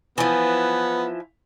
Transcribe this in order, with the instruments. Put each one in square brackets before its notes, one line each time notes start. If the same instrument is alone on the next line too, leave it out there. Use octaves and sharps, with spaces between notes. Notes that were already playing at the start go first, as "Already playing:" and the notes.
[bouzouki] E3 F3 [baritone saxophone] B3